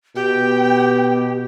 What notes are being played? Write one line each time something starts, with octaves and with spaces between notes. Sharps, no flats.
B2 G4 G5